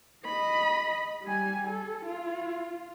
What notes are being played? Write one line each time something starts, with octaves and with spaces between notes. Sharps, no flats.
D#5 B5
G3 G#5
A4
F4